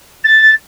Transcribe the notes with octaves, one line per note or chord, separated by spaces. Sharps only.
A6